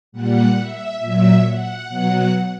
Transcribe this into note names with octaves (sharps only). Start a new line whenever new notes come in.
A#2 G3 F#5
E5
A#2 F#3 E5
F#5
B2 F#3 F#5